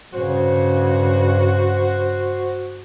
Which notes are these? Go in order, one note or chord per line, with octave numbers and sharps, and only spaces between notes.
G2 C#3 F#4 C5